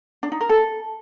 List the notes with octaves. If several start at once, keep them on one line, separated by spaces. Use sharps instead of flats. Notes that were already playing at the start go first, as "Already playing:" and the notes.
D4
D#4
A#4
A4